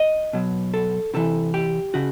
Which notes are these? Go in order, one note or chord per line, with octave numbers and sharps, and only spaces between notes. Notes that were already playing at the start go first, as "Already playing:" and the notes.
Already playing: D#5
B2 F#3
A4
C3 E3 A4
G4
C#3 F#4